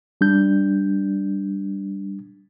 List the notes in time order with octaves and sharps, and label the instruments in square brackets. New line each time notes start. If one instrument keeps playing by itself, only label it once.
[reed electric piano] G3 D4 G6